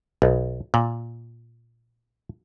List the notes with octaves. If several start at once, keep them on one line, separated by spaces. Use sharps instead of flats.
B1
A#2